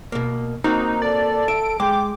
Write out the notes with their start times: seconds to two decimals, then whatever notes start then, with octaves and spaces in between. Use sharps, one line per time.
0.12 B2 A#3
0.64 A#3 C4 D#4 F#4
1.02 A4 D5
1.48 E5 D7
1.80 G#3 G5 D6